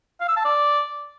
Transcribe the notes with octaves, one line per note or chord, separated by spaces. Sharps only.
F5
E6
A5
D5